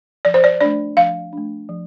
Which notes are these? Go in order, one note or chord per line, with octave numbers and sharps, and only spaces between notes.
F3 D5
C5
D5
A3 D4 D5
F3 F5
A3 D4
F3